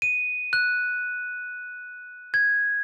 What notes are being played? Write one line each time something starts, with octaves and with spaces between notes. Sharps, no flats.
D#7
F#6
G#6